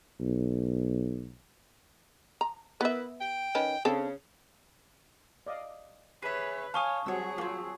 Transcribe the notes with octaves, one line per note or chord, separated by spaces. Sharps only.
B1
A#5
B3 E4 A#4 B4 E5
G5
D#3 C#4 B4
C#3 C4 D4 A4
D5 D#5 F5
G#4 B4 C#5 E5
C#5 F5 G#5 A5 C#6 D#6
F#3 G3 C4 F#4 G#4 C#5 E6
A#3 C4 F4 G#5